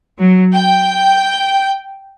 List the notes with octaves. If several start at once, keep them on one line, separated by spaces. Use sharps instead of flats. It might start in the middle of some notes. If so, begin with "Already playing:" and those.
F#3
G5